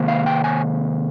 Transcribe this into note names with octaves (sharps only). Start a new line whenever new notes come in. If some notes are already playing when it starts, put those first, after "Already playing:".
Already playing: C3 D#3 A#3
F5
G5
G#5